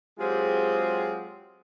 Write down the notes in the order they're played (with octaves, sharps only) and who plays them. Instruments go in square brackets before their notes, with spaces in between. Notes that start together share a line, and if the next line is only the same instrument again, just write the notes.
[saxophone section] F#3 G#3 C4 F4 G4 G#4